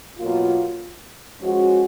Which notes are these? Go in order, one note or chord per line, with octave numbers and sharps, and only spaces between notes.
B2 F#3 A#3 F4
F3 G#3 C#4 F#4